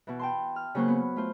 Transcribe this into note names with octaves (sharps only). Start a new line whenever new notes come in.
B2 E3
G5 A5 C6
F6
C#3 F#3 A#3 C5 C#6 F#6
B3
A3 F4 C5